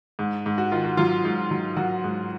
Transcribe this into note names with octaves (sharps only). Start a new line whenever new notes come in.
G#2
G#2
F#4
D#3 F4
F#4
F#3 F4
G#2
F#3
F#3 F#4
G#2